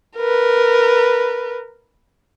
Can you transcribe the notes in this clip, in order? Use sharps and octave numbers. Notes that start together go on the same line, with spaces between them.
A#4 B4